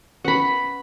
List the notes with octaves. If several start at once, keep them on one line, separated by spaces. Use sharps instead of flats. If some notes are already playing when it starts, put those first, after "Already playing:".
C#4 B4 F#5 B5